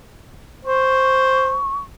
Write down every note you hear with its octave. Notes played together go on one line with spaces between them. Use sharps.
C5 C#6